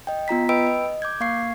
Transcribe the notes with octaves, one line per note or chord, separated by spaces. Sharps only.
D#5 G5
B3 F4 A#5 B6
B4 D#5 G5 B5 E6 D7
D#5
D6 G6 G#6
A#3 F5 C#6 G#6 C7